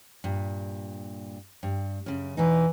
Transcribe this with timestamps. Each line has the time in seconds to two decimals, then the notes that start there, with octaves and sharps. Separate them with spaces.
0.24 G2 A#2
1.63 G2
2.06 F#2 C#3
2.37 E2 B2 E3 D#4